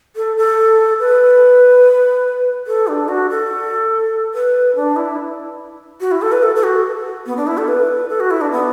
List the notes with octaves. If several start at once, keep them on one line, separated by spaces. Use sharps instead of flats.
A4
A4
B4
A4
D4
F#4
A4
B4
D4
E4
F#4
E4
A4
B4
A4
A4
F#4
B3
D4
E4
A4
B4
A4
F#4
E4
D4
B3